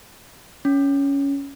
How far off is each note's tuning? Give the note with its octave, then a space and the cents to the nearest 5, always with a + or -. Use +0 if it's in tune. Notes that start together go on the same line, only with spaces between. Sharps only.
C#4 +10